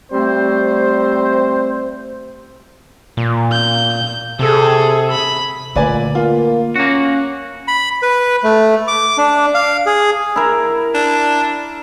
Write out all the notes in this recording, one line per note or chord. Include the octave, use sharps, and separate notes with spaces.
G3 A3 C4 C5
A#2
G6
C3 G#4 A4
B5
A#2 D3 A3 B4 D5 G#5
A#3 F4
A#3 C#4 F#4
B5
B4
A3
D6
D4
F5
G#4
E4 A#4
D4